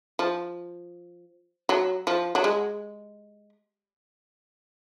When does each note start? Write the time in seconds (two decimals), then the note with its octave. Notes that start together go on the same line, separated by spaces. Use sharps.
0.19 F3
1.69 F#3
2.07 F3
2.35 F#3
2.44 G#3